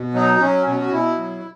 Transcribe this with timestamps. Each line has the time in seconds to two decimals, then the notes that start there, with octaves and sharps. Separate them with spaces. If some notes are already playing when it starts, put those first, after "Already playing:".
Already playing: B2
0.14 F#3 D#4
0.40 F#3 C#4
0.67 B2 C#4
0.80 F#4
0.92 B2 E4
1.18 F#3